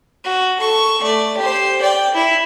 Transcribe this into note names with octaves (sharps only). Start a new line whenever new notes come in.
F#4
A4 C#6
A3 D5
G4 C5
D5 G5
E4